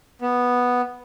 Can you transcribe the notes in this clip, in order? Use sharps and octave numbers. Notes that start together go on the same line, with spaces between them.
B3